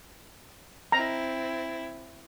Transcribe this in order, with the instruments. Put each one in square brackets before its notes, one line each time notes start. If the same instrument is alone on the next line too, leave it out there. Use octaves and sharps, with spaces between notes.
[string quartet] C4 E4 [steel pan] A#5